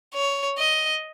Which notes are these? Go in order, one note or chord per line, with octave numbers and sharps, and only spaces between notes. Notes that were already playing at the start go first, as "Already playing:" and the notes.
C#5
D#5